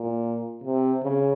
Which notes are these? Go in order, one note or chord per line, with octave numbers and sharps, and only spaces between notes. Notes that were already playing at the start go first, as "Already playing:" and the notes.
Already playing: A#2
C3
C#3